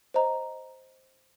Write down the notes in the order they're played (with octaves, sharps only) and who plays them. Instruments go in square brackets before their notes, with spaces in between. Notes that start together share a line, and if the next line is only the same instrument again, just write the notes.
[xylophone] C5 D#5 A#5